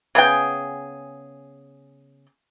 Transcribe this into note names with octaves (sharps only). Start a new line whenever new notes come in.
C#3 B3 G#4 G5